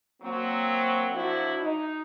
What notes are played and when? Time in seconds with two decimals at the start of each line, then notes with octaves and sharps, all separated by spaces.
0.22 F#3 A#3 C4
1.11 F3 F#3 D4 E4 F#4
1.61 D#4